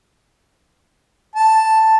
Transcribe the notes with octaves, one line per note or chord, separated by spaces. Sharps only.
A5